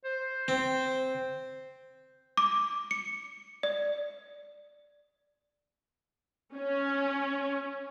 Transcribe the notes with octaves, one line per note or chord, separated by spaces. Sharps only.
C5
C4
D6
C#7
D5
C#4